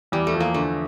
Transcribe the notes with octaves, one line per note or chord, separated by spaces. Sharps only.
E2 G3
A3
F3
A#3
D3 A3